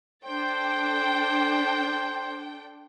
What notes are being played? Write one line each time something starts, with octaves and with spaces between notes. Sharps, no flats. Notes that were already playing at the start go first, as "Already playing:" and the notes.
D4 A4 C5 G5